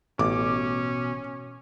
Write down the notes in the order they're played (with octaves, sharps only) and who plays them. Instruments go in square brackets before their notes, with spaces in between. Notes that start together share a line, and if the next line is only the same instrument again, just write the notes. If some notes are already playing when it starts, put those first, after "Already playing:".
[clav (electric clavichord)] A1 [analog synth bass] B2 [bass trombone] C#4 [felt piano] D6